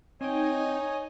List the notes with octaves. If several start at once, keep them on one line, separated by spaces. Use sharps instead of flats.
C4 D#4 C#5 D#5 G5 G#5